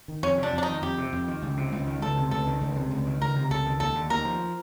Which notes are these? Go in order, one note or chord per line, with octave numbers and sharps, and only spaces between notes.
D#3
F2 C#4
C3
D4
F2 D4
D#4
D#3
F2 G4
C3
F2
D#3
C#2
C3
C#2
D#3
C#2 A4
C3
C#2 A4
D#3
C#2
C3
C#2
D#3
C#2 A#4
C3
C#2 A4
D#3
D#2 A4
D3
D#2 A#4
F3